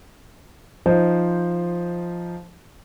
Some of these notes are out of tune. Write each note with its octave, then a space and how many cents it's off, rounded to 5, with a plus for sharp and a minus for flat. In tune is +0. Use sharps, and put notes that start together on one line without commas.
F3 -5 D#4 +0 C5 +0